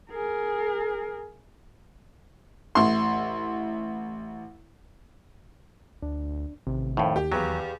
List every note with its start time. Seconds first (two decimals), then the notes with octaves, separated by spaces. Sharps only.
0.11 G#4 A#4
2.75 A1 E4 C6
6.02 D2 D4
6.67 A1 C3 D#3
6.97 F2 A2 D#3
7.16 D#2 G4
7.32 E2 F#3 G4 B4 F5